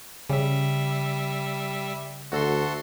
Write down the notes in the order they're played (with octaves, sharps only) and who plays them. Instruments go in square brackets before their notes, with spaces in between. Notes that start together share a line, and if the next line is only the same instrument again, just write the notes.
[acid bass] C#3 [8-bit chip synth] G3 E5
[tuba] D2 [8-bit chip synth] F#4 A4 C6